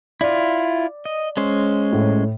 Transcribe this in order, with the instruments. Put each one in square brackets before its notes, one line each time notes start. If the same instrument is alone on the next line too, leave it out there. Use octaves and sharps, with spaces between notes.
[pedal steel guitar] E4 F4 [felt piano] D5
[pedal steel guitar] D#5
G#3 C#4 C5
[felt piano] A2